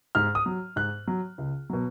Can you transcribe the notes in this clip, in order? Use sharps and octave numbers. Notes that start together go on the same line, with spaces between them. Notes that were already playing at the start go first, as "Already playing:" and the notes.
G#2 F6
D#6
F#3
G#2 F#6
F#3
C#2
B2 F#3